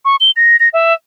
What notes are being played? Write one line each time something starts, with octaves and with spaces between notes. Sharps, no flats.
C#6
G7
A#6
A#6
E5